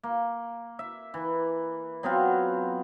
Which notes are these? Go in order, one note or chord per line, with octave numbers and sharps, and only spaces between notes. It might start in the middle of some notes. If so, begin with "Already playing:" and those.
A#3
E5
E3
F#3 B3 C4 F4